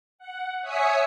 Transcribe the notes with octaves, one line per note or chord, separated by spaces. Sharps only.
F#5
C#5 E5 G#5 D#6 B6 C#7